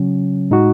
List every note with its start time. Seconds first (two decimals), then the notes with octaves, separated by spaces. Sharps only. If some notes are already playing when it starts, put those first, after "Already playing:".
Already playing: C#3 F#3 C#4
0.51 A2 G#3 D#4 F#4